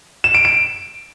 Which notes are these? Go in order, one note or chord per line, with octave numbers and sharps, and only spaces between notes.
E7
D7
D7